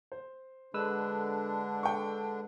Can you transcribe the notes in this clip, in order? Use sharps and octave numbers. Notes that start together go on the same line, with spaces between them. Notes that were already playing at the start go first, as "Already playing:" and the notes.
C5
D3 G#3 D4 B4 E6
G5 C#6